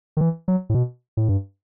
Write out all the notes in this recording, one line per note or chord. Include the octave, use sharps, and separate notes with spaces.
D#3
E3
F#3
A2
B2
A2
G2